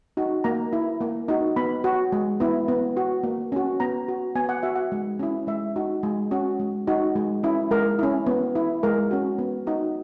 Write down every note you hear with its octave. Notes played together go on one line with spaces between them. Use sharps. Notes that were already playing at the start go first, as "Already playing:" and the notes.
D#4 F#4
A#3 A#5
E4
A#3
D#4 F#4
B3 B5
F#4
G#3
B3 E4
B3
F#4
A#3
C#4 F#4
B3 A#5
F#4
B3 G#5
F#5
F#4 E5
F#5
G#3
C#4 E4
G#3 E5
D#4 F#4
G#3
C#4 F#4
G#3
D#4 F#4
G#3
C#4 E4
G#3 A#4
C#4 E4
B3
E4
G#3 A#4
C#4 F#4
B3
D#4 F#4